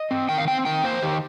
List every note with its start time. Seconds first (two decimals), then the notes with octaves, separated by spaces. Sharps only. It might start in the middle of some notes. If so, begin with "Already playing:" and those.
Already playing: D#5
0.11 C4
0.29 D#3 G5
0.38 F5
0.48 C4 G5
0.65 D#3 G5
0.84 A#3 C5
1.02 D#3 G4